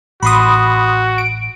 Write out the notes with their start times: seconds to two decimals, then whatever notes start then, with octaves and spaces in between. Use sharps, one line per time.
0.22 A1 F#4 B5 C6 D#6
1.18 D7